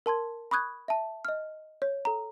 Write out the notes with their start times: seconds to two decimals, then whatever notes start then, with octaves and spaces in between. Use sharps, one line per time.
0.06 A#4 A5 C6 G#6
0.51 B5 C#6 D#6 F#6 G#6
0.88 E5 A5
1.25 D#5 F6
1.82 C#5
2.05 A4 A#5